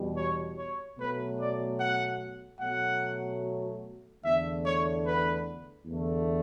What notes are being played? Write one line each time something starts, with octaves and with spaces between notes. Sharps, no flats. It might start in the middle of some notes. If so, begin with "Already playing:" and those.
Already playing: E2 B2 G3
C#5
C#5
B2 F#3 A3 B4
D5
F#5
B2 F#3 A3 F#5
E2 D3 A3 E5
C#5
B4
E2 D3 A3